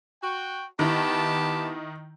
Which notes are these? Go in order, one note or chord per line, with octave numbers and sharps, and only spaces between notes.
F#4 G5
D#3 B3 E4 G4 A5